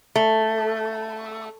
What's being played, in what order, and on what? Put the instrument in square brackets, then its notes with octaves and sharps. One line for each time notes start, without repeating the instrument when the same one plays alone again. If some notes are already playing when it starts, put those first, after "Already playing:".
[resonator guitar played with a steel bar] A3